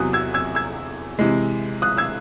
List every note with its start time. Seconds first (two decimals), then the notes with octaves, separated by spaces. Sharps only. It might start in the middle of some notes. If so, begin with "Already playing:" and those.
Already playing: E2 C3 F#3 D#6 F#6
0.13 E6 G#6
0.34 E6 G#6
0.55 E6 G#6
1.19 C3 E3 G#3
1.82 D#6 F#6
1.98 E6 G#6